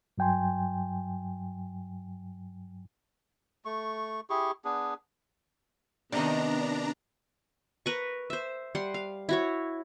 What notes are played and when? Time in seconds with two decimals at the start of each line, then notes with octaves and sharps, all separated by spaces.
0.18 G2 F#3 G5 G#5 C6
3.65 A3 C#6
4.30 E4 G4 G#4 C#6
4.65 B3 D4 G#4
6.12 C3 D#3 B3 D4 A#5
7.86 A#4 B4 C#6
8.30 C5 E5
8.75 G3 F#5 C6
8.94 F5
9.29 E4 F#4 C#5